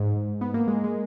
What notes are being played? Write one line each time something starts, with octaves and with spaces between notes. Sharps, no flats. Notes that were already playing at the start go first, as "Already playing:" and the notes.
Already playing: G#2
B3
A#3
G#3
G#3